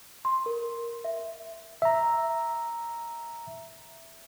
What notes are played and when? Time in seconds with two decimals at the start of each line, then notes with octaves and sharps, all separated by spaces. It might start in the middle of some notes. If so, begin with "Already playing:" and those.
0.25 C6
0.46 A#4
1.04 E5
1.82 E5 A#5